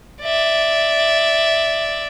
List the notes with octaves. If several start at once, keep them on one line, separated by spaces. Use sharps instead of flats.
D5 E5